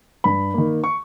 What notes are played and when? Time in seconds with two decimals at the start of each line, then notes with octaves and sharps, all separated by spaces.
0.24 G2 B5
0.54 D#3 A#3
0.84 C#6